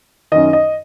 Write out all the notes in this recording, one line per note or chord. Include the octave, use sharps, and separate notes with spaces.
F#2 D#3 D#5
D#5